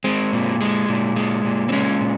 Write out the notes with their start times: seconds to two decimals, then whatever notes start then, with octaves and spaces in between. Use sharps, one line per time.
0.04 G#3 C4
0.33 A#2
0.61 G#3
0.89 A#2
1.16 G#3
1.45 A#2
1.69 C4
1.72 G#3 C#4
2.00 A#2